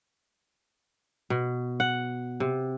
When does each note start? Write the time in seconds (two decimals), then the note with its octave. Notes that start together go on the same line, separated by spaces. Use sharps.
1.30 B2
1.80 F#5
2.40 C3